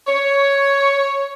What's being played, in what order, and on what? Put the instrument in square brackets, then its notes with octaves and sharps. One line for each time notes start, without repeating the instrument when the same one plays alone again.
[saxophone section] C#5